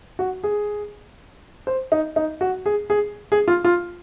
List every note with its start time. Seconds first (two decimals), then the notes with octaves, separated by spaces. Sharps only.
0.19 F#4
0.44 G#4
1.67 C5
1.92 D#4
2.16 D#4
2.41 F#4
2.66 G#4
2.90 G#4
3.32 G#4
3.48 F4
3.64 F4